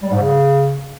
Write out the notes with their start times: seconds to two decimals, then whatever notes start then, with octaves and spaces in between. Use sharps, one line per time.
0.03 G3
0.11 G#2
0.19 C#3